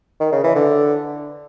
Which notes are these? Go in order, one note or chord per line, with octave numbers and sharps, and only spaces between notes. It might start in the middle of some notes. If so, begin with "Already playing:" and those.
D#3
C#3
E3
D3